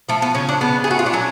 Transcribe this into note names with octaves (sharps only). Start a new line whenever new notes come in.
F3 A3
B3
C#3 C#4
D4
C#3 B3
G#4
A3 F#4
F4
D4
F#3 C#4